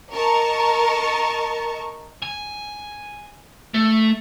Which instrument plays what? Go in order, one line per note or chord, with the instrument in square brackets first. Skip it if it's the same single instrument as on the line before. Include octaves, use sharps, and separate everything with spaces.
[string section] A#4 D#5 A5 C#6
[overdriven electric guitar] G#5
A3